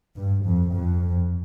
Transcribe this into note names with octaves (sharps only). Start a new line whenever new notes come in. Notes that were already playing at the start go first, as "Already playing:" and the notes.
G2
F2
F2